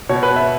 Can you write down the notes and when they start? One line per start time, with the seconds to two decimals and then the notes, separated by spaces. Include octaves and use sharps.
0.09 B2 C#5
0.23 B4
0.30 B2
0.36 E5